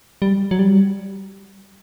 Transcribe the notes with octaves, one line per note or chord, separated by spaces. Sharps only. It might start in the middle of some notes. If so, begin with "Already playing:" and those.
G3
F#3
G3